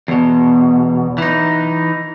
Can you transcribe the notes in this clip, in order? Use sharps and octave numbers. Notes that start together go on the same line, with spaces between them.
E2 B2
E3 D#4